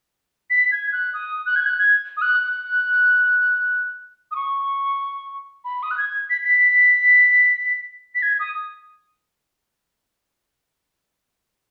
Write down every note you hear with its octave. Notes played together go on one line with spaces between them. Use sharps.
B6
G#6
F#6
D#6
F#6
G#6
F#6
G#6
D#6
F#6
F#6
D#6
C#6
B5
D#6
F#6
G#6
B6
B6
B6
G#6
D#6